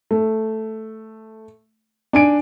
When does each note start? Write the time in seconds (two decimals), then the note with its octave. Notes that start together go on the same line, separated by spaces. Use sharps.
0.11 A3
2.13 D4 G#5 D7